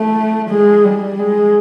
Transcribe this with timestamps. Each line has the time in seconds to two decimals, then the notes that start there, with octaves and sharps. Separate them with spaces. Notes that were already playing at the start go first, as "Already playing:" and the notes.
Already playing: A3
0.50 G#3
0.85 G3
1.19 G#3